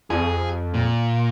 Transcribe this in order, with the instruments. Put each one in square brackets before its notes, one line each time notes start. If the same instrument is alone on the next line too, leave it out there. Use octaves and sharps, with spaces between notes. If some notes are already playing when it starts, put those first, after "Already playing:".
[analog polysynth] F2 [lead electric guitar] G#4
[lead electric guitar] A#2